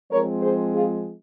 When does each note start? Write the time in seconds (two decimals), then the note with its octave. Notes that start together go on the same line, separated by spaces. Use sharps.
0.11 F3 G#3 C4 A#4 C#5
0.42 G#4 C5
0.74 F4 G#4